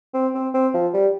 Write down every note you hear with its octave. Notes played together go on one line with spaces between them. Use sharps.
C4
C4
C4
F3
G3